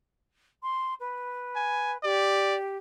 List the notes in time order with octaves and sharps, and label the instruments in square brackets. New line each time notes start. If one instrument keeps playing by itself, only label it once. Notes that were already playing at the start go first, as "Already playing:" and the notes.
[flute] C6
B4
[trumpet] G#5
[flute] G4 [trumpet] D5